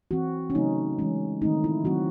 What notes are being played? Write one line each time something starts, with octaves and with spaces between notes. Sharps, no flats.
E3 C4 F#4
C#4
C#3 F#3 A3 C4 D#4
E3 G#3 C#4
D#3 A3 C4 D#4
E4
D#3 F#3 C4 F#4